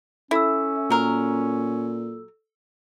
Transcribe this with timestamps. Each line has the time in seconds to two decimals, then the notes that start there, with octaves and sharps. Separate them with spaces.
0.31 C#4 E4 A4 E6
0.90 A#2 F#3 A#4